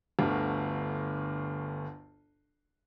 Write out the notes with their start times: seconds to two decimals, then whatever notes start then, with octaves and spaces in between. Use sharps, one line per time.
0.19 G1 D2